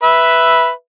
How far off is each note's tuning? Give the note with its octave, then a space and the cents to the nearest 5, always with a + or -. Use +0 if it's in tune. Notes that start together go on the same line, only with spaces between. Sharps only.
B4 +0 E5 +0